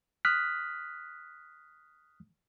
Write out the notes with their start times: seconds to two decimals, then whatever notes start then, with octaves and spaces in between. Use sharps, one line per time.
0.25 D#6 F6 F#6 B6